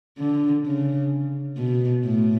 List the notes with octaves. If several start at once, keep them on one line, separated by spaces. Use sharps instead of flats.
D3
C#3
B2
A2